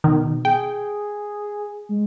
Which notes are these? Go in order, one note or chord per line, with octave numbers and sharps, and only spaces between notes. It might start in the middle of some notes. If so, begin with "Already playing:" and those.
B2 D#3
G#4 G5
G#3